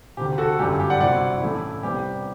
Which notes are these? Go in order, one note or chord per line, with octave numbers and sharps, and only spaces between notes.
E1 D2 C3 G4
F#4 A4
G1 F#2 D3 G3 G4
G4
D5 F#5
C2 B2 G3 C4 E4 D5 F#5
A1 A2 E3 A3 E4
C2 C3 G3 B3 G4